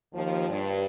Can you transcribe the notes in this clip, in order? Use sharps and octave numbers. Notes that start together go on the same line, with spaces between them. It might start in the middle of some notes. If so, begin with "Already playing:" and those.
D#2 F3
G2